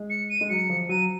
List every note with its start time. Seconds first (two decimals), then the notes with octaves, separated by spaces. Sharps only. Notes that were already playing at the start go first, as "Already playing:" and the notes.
Already playing: G#3
0.10 C#7
0.30 D#7
0.41 G#3
0.49 F#3 C#7
0.70 F3
0.89 F#3 D#7